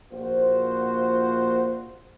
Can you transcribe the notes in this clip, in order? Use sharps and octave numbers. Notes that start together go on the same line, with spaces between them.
A#1 A#2 F4 F#4 C5